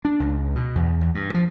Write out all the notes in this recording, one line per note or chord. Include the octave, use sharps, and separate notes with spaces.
D4
C#2
B2
E2
E2
G2
F3